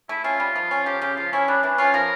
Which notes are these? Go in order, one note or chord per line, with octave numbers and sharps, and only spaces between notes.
A3 E4
C#4 F4
G3
F3
C#4
F3 G4
C#3 G4
F3 F4
C#4 E4
G3 D4
E3 D4
C#4 F4
F3 A#4